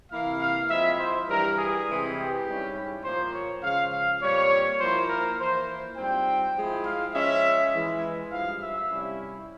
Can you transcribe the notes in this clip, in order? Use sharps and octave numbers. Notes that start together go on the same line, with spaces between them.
C3 E3 A#3 E4 F5
F5
F3 G#3 C4 E4 E5
C5
G2 E3 G3 A#4
G#4
C3 E3 G#3 C4 E4
G4
G#2 G3 C#4 E4
A#2 F3 A#3 C5
C#5
C#3 F3 G#3 F5
F5
A#2 G3 C4 C#5
F3 A#3 E4 C5
A#4
E3 A#3 E4 C5
G#2 G3 C4 F4 G5
F3 G#3 E4
F5
F3 G#3 C#4 E5
E3 G#3 E4
G2 F3 G#3 F5
E5
C3 G3 C#4 E4